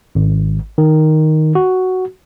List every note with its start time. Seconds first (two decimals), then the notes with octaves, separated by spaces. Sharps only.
0.15 G#1
0.78 D#3
1.55 F#4